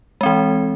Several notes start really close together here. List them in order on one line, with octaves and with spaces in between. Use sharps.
G#3 C4 E3